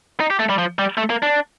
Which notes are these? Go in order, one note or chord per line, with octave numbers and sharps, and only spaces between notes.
D#4
G4
A3
G3
F3
G3
A3
A#3
D4